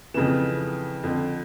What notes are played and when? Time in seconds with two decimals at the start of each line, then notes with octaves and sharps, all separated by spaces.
0.14 F2 C#3 E3 E7
1.04 F2 D3